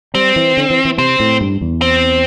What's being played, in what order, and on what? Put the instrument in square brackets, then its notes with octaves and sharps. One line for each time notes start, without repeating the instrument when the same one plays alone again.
[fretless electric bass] G3 [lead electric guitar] C4
[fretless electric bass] E3
D3
E3
E3
[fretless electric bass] C3 [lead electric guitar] C4
[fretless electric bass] A2
G2
E2
[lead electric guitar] C4